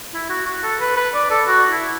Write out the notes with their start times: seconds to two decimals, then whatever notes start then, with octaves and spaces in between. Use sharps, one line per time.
0.14 E4
0.30 F#4
0.46 F#4
0.63 A4
0.80 B4
0.97 B4
1.15 D5
1.31 A4
1.48 F#4
1.71 E4